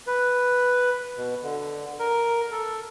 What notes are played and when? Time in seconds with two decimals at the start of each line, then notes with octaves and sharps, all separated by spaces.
0.07 B4
1.17 B2
1.43 D3
1.99 A#4
2.51 A4